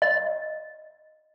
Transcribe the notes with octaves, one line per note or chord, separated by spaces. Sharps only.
D#5